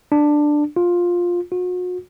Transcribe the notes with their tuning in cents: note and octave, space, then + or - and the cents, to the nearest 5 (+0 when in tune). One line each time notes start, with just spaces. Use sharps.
D4 +10
F4 +10
F#4 -40